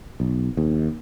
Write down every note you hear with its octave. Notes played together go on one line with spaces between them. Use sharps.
B1
D#2